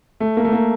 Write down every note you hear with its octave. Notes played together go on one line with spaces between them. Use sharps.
A3
A#3
A3
A#3